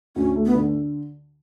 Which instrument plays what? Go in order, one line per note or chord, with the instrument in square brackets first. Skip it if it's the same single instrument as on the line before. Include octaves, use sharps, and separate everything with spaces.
[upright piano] D2 [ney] C#4
[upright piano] A3
[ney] B3
[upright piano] D3